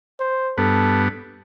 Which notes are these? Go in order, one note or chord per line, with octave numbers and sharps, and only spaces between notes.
C5
G2 B3 A4